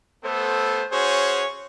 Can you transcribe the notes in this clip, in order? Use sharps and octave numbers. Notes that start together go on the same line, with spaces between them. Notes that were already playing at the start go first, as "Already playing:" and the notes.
A3 B3 A4 C5
C#4 F#4 G#4 C5 C#5